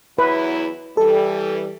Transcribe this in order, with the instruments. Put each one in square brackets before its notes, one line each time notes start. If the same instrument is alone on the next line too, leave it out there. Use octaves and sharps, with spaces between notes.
[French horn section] E2 F#3 E4 [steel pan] B4
[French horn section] E3 G3 [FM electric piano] A4